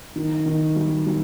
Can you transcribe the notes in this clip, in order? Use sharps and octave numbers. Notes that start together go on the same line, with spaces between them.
D#3
D#3
G3
G3